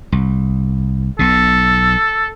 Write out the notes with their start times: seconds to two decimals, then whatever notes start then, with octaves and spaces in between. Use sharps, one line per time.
0.12 C2
1.19 B1 B2 A4